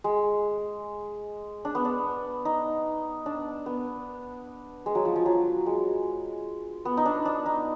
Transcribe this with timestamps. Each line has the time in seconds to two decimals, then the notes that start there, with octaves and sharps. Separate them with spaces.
0.04 G#3
1.65 D4
1.75 B3
1.85 D4
2.45 D#4
3.26 D4
3.66 B3
4.86 G#3
4.95 F#3
5.05 F3
5.16 F3
5.26 F#3
5.66 G#3
6.85 B3
6.97 D#4
7.06 D4
7.25 D4
7.46 D#4